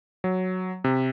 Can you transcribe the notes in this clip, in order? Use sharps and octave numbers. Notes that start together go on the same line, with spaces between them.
F#3
C3